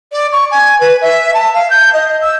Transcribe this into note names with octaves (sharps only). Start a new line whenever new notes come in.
D5
C#6
G#5
B4
E5
A5
F5
G6
D#5
E6